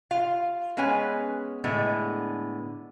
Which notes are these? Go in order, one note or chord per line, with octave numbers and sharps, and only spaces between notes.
F4 F5
G#3 B3 C#4 B4 C#5 G#5
A2 D3 G#3 B3